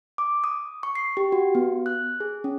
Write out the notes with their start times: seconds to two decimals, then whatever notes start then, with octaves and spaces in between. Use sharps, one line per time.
0.18 D6
0.44 D#6
0.83 C#6
0.95 C7
1.17 G4
1.32 F#4
1.55 B3
1.86 F#6
2.20 G#4
2.44 C#4